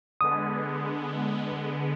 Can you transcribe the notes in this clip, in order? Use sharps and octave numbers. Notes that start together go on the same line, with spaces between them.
D3 G#3 B3 D#6